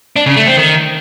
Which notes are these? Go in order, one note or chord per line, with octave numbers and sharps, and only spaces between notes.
D4
C#3
A3
C4
D#3